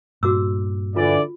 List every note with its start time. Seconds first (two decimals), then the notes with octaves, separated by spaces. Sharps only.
0.23 G2 A#2 F#4 D6 E6
0.96 D3 E3 F4 D5